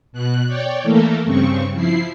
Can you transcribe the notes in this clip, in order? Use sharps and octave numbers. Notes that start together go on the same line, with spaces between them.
B2 F#6
C#5 D5 G5
E3 A3 A#3 A4 A#4
G2 C#3 C4 C#6
F3 E4 C7